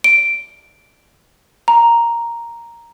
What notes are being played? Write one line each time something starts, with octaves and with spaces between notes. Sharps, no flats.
D7
A#5